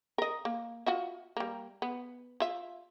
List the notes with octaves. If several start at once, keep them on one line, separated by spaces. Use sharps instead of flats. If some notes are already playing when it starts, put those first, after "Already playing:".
A#4 D#5
A#3
F4 F#4 E5
G3 A#3
B3
F4 E5